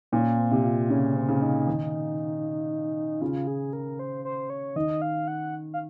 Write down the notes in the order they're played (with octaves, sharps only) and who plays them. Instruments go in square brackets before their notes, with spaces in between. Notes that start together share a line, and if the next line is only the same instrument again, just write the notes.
[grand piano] A#2 [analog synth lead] C#4
[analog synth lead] C4
[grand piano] C3
[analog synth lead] F4
[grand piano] C#3 [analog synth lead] C#4
[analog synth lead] C4
[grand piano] C#3
[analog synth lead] D#4
[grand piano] D#3
[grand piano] C#3 [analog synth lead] F4
[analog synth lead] G#4
A#4
C5
C5
C#5
[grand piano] D#3 [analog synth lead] D#5
[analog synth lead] F5
F#5
F5